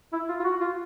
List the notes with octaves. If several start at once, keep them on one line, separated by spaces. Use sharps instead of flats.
E4
F4
F4
F#4
F4